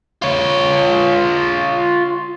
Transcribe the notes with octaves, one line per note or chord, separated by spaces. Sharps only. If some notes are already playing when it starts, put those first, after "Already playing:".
F4 C#5